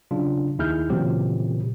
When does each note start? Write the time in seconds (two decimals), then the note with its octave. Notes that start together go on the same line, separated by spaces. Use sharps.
0.11 C#3 F#3 D4 F4
0.59 D#2 D#4 E4 G#4 F6 G6
0.90 A#2 C#3 E3 F#3 C4 G4